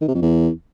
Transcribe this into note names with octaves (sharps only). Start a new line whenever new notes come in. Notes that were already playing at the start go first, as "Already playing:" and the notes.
D#3
C3
F2
E2